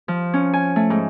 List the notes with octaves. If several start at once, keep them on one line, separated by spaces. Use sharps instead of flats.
F3
C#4
G#5
A3
G#2